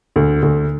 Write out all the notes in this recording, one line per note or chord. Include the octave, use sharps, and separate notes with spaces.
D2
D2